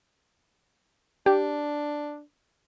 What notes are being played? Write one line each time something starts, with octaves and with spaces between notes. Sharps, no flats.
D4 G4